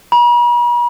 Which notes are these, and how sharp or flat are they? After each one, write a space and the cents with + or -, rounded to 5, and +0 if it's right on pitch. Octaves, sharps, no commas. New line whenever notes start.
B5 -45